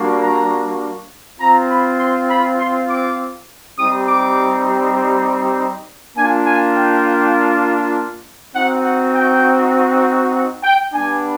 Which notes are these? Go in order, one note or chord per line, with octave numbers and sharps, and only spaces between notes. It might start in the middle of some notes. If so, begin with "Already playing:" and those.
Already playing: G3 A#3 D4 F#4
A#5
C4 F4 A#5
B5
C6
B5
C6
D6
G3 C4 D#4 G4 D#6
D6
A#3 D4 F4 G#5
G#5
G5
C4 D#4 F#4 F#5
F#5
G5
F#5
G5
G3 B3 D4 G#5